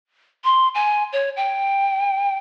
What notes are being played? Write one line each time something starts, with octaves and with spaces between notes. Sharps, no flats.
C6
G#5
C#5
G5